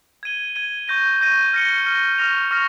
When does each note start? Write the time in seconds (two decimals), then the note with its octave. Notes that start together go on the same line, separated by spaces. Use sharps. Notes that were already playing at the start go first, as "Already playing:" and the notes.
0.23 G#6 D#7 G7
0.55 G#6 D#7 G7
0.88 C#6 G6 A#6 D#7
1.21 C#6 G6 A#6 D#7
1.53 F6 A#6 C#7 G7
1.86 F6 A#6 C#7 G7
2.18 C#6 F6 A#6 F7
2.51 C#6 F6 A#6 F7